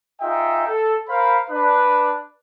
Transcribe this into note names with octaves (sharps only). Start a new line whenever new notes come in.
D#4 F4 G#4 D#5 E5 G5
A4
A#4 C5 F5 B5
D4 B4